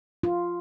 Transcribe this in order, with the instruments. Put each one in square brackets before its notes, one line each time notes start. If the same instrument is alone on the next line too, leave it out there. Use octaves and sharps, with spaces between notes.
[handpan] F4